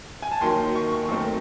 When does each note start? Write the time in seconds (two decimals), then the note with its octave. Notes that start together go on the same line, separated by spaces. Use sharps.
0.22 G#5
0.31 A5
0.41 D#2 D#3 F#3 C6
0.75 C#6
0.92 C#6
1.09 F#2 D#3 A3 C4